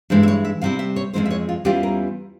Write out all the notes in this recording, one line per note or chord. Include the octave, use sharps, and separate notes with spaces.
G2 E3 G#3 E4 C5
E5
C#5
E5
C3 G3 C4 E4 F5
E5
C#5
F2 C#3 E3 G#3 C4 C5
E5
C#5
F4
E2 E3 G3 C#4 F4 G4
A#4